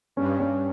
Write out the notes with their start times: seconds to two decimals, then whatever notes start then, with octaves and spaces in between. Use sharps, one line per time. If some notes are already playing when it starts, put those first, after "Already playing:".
0.16 G2 C#4
0.40 C#4